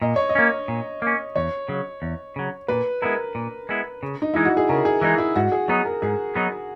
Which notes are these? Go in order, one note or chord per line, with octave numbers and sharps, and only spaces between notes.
A#2 D#5
C#5
D#5
A#3 C#4
A#2
A#3 C#4
E2 C#5
C#3 F#3
E2
C#3 F#3
A#2 B4
G#3 B3 E4 A#4
A#2
G#3 B3 E4
C#3
D#4
E3 G#3 D#4 E4
F#4
G#4
C#3 A#4
G#4
E3 G#3 D#4 E4
E4
G#2 F#4
G#4
F#3 B3 D#4 G#4
A#4
G#2 G#4
F#3 B3 D#4